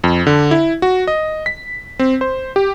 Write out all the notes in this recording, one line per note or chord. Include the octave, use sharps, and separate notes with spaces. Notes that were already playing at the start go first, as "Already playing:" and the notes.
F2
D3
E4
F#4
D#5
B6
C4
C5
G4